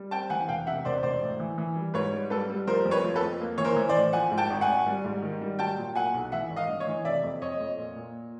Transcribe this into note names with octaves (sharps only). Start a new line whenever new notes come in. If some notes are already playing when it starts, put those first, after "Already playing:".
Already playing: G3
C4 G5 A5
E3 F#5 G#5
E1 F5 G5
C3 E5 F#5
E1 C5 D5
E1 C5 D5
A2
E3
E3
G3
G#2 B4 C#5
G3
G3 A4 B4
G3
F3 A#4 C5
F2
B4 C#5
F3
A4 B4
F2
A#3
E3 C#5
A#4 C5
E3
C5 D5
A2
F3 F#5 G#5
G#2
G5 A5
G#1
F#5 G#5
G#1
G3
G#2
D#3
G3
F#3 G5 A5
A#2
F#3 F#5 G#5
B1
E3 E5 F#5
G#1
D#5 F5
G2
C#5 D#5
E3
C3 D5 E5
F2
F2 C#5 D#5
F2
A#2
A#2